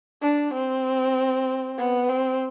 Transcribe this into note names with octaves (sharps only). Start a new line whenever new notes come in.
D4
C4
B3
C4